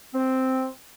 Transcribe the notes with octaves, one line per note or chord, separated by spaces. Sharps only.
C4